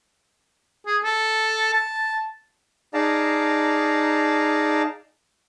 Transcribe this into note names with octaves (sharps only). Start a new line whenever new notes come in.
G#4
A4
A5
D#4 G#4 D5 F5 A5 A#5